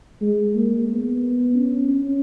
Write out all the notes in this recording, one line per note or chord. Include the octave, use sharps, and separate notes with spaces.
G#3
A#3
B3
C#4
C#4